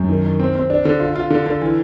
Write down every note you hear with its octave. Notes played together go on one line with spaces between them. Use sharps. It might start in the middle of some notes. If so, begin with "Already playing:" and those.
Already playing: F#2
D#3
D#3
C4
C4
D4
D3
F4
F4
D3
D3
E3